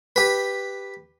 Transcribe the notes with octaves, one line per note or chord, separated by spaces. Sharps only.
G4 B4